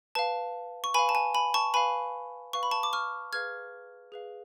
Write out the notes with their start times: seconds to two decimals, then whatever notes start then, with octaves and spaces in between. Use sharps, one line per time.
0.15 B4 F5 A5
0.84 C#6
0.94 B4 F5 G#5 B5
1.09 A5
1.15 G#5
1.35 G#5 B5
1.54 A5 C#6
1.74 B4 F5 G#5 B5
2.53 B4 F5 C#6
2.63 B5
2.71 A5 C#6
2.83 D6
2.93 C#6 F6
3.32 G#4 B4 F5 F6 G#6
4.12 G#4 B4 F5